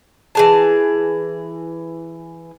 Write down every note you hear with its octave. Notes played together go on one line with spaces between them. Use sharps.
E3 G#4 A5